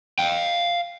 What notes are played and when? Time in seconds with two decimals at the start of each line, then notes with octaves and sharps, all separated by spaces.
0.19 F5 G5